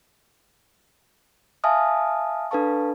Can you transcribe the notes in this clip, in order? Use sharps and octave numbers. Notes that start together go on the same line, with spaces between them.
E5 F5 G#5 A5 D#6 F6
D4 A4 B4 F5 A5 C#6